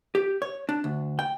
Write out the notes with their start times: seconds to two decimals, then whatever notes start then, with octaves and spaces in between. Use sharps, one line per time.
0.15 G4
0.42 C#5
0.69 D4
0.84 D2
1.19 G5